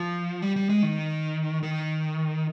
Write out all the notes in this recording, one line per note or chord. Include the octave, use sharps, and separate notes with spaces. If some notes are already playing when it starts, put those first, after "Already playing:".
Already playing: F3
G3
G3
G#3
D#3
D#3